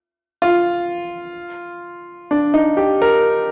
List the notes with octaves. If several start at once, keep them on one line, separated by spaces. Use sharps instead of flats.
F4
D4
D#4
G4
A#4